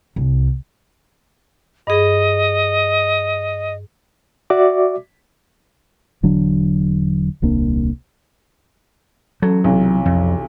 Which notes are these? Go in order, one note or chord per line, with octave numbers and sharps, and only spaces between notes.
C2
G2 G#4 D#5
F#4 D5 E5 D6
E1 D3 F#3 D4
D#1 C2 A#3 D4
A1 F#3 A4
B1 C3 E3
F2